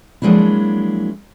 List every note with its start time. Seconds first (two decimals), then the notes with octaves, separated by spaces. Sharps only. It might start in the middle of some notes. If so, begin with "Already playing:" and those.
0.22 F3 F#3 G#3 A#3 D4 E4